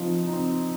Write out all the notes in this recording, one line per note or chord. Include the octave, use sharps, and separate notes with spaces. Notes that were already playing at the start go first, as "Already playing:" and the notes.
Already playing: F3 C4 D#4
C4 D#4